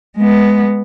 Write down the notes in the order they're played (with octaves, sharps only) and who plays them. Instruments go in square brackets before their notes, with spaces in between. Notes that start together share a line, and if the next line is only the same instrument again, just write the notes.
[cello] G#3 B3